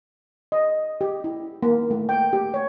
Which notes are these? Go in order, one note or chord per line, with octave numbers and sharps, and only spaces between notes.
D#5
G4
E4
A#3
A3
G5
G4
C#5